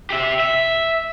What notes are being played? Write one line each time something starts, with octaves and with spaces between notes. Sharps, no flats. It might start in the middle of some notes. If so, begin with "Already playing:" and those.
G4 E5
E5